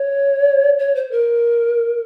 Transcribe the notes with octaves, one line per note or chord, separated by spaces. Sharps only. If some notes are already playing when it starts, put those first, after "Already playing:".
Already playing: C#5
C#5
C5
A#4